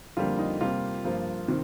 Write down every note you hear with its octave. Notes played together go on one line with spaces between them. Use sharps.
F2 D3 G3 A#3 F4
D#4
C3 G3 A#3 F4
G2 F3 A#3
C3 D#3